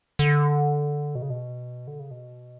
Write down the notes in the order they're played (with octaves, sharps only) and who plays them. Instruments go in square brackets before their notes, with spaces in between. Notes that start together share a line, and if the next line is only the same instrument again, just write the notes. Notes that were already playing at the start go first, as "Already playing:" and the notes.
[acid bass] D3
B2
C#3
B2
D3
C#3
B2